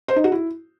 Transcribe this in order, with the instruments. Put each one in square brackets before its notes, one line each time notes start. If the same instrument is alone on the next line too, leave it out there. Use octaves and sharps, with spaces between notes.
[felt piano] C5
D#4
F#4
E4